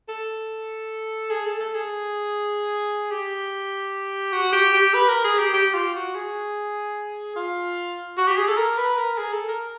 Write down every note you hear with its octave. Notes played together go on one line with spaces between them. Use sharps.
A4
G#4
A4
A4
G#4
G4
F#4
G4
G4
B4
A#4
G#4
G4
G4
F4
F#4
G#4
F4
F#4
G4
G#4
A4
A#4
B4
A#4
G#4
A4
A#4